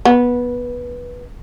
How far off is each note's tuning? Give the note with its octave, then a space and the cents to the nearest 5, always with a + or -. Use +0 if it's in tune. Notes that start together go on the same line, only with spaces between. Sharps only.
B3 -15